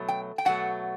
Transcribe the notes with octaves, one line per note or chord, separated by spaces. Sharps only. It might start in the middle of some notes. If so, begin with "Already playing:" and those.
Already playing: B2 F#3 A3
G5
G5
B2 F#3 A3 F#5